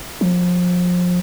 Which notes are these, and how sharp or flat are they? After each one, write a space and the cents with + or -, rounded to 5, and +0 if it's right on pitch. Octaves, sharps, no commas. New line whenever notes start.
F3 +30